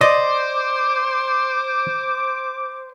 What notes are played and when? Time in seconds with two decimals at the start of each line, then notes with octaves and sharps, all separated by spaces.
0.01 C5 D5 D#5 D6